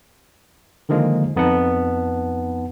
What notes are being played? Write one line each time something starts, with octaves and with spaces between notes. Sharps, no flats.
D3 D#3 F3 G#3 A#3
F2 B3 D#4 F#5 A5